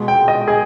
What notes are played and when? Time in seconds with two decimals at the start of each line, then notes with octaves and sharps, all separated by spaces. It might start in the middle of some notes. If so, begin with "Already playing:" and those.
Already playing: B2 G#3
0.08 G5
0.28 D#5
0.48 G#4